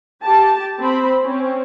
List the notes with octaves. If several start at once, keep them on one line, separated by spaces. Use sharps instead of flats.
G4 A5
C4 C5 B5
C4 C#4